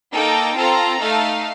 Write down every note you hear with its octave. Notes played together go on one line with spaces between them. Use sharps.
A#3 D#4 A4 G5
C4 F4 A4 A#5
A3 D#4 A4 F5